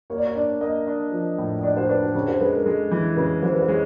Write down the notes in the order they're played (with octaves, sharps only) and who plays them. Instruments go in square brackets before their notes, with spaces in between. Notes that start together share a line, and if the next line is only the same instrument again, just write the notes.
[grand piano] A#3 [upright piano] C#5
[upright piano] D5
C#5
[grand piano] D4 [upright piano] D5
[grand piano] A#3 [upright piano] D#5
[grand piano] D4
F3
A2
[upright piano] D#5
[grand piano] D4 [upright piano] D5
[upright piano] C5
[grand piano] D4 [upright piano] B4
[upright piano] C5
[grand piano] C#3 [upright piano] C#5
[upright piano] C5
[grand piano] G#3 [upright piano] B4
[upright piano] A#4
[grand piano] G#3 [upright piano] A4
[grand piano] E3
[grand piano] C#3 [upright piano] B4
[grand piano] E3 [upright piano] C5
[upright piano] B4
C5
[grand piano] G#3 [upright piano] C#5